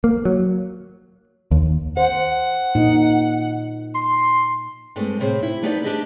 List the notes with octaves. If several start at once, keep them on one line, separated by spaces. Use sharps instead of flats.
A#3
F#3
D#2
C5 F#5
A#2 D#4
C6
G2 G#3 A3 C4
A2 C3 C4 G#4 C5
E4
A3 B3 D#4 G4 C5 D5
D4 G4 G#4 D#5 E5